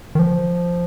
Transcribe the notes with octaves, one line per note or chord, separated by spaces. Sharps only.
D#3
F3